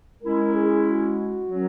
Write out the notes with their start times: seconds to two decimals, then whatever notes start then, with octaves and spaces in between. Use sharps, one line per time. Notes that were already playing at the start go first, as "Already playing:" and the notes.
0.22 G#3 C#4 E4 A#4
0.54 G#4
0.85 F#4
1.48 D#3 F#3 C#4